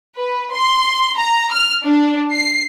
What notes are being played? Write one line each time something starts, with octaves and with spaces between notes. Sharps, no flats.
B4
C6
A#5
F6
D4
C7